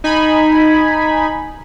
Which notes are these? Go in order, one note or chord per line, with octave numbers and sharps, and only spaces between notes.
D#4 G#5 B5